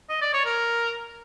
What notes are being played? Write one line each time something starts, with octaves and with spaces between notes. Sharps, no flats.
D#5
D5
C#5
A#4